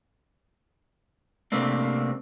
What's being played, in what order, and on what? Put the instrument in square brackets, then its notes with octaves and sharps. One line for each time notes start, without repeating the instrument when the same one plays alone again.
[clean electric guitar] C3 A3 A#3 C4 D4